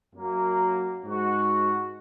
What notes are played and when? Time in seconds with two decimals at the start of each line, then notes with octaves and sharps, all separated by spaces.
0.15 F#2 F#3 A#3
1.03 G#2 G#3 F#4